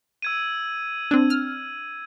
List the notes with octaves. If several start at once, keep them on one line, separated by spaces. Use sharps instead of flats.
E6 G#6 D#7
C4 D4
F6